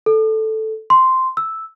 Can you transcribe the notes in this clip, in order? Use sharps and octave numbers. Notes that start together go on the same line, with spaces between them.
A4
C6
E6